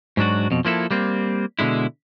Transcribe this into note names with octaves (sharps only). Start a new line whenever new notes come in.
G#2 F#3 D4 F#4
F2 B2
F3 A#3 E4 A4
G3 A#3 C4
B2 D3 G#3 E4